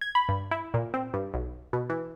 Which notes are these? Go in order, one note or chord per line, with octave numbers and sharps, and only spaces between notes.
G#6
B5
G2
E4
A#2
C4
G2
B1
B2
E3